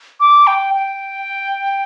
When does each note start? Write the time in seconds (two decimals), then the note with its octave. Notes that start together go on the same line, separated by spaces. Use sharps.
0.20 D6
0.47 G5
0.74 G5